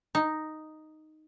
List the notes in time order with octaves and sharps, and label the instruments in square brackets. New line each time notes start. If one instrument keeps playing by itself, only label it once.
[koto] D#4